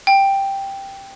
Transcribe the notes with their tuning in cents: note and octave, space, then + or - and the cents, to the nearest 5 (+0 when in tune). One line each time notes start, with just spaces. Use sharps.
G5 +0